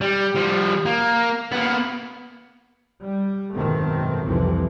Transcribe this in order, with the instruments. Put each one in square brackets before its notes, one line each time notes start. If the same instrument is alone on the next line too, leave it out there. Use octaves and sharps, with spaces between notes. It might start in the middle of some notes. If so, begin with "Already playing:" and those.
[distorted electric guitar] G3
F3 G3
A#3
A#3 B3
[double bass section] G3
G#1 F#2 B2 D#3 A3 C4
C2 F2 C3 E3 F3